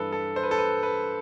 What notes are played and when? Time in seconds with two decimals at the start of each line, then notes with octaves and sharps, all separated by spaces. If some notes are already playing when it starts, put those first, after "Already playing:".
Already playing: G2 E3 A4 B4
0.12 A4
0.36 C5
0.43 B4
0.51 A4
0.58 B4
0.83 B4